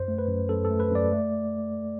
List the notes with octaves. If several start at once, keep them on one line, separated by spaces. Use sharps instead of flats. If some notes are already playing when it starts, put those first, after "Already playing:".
Already playing: F#2 C5
A3
B4
F#2
F#2 A4
A4
A3
B4
F#2 D5
A3